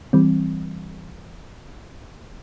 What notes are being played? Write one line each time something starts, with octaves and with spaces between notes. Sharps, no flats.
E3 G3 C4